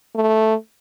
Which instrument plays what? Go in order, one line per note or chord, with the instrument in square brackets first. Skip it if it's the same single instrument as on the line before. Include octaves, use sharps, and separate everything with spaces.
[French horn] A3